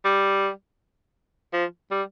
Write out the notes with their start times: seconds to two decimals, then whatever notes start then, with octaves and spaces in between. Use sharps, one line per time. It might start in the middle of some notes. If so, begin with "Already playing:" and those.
0.04 G3
1.53 F3
1.91 G3